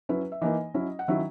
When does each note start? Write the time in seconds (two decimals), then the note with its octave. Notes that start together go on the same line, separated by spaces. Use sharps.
0.09 F#3 C#4 E4 B4
0.32 E5
0.41 E3 A#3 D#4 D#5
0.74 F#3 C#4 E4
0.99 F#5
1.08 D#3 F#3 C#4 E4 E5